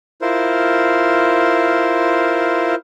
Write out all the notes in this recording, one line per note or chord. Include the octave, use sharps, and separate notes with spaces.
E4 F4 A#4 C5